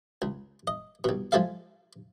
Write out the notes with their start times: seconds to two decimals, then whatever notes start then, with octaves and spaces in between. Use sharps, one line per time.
0.22 C#2
0.67 D#5
1.04 C2 B2
1.32 F3 G#3 A4 E5 F5